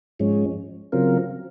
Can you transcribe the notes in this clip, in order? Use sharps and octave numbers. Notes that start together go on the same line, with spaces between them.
G#2 F3 G#3 C#4
C#3 F#3 C4 F4 A#4